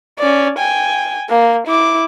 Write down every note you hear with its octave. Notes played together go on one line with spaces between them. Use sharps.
C#4 D5
G5 G#5
A#3
E4 D6